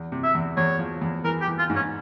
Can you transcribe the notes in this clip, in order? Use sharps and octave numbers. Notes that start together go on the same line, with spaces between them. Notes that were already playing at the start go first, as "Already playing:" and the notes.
Already playing: E2
C3
E5
E2
E2 C#5
F3
E2
E3 A#4
G4
E3
F4
G#2
C#4